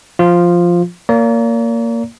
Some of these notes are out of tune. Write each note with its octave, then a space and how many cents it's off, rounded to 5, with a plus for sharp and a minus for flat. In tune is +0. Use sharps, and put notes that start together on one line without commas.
F3 +0 F4 +0
A#3 -10 D5 -45 A#5 +0